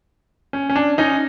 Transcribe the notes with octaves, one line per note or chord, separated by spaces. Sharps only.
C#4
C#4
D4
C#4 D#4